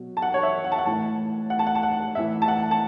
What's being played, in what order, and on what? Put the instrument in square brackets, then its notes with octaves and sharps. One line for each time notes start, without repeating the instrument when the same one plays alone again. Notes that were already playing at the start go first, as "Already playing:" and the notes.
Already playing: [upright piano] B2 F#3
A5
F#5
C#5
E5
F#5
A5
F#5
A2 E3 A5
F#5
A5
F#5
A5
F#5
A2 E3 E5
A5
F#5
A5